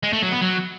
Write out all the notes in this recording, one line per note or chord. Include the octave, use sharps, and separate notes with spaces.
G#3
A3
F#3
B3
F#3